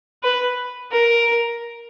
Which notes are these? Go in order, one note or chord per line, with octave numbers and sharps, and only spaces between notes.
B4
A#4